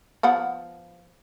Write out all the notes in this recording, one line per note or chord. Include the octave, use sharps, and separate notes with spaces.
F3 B3 F#5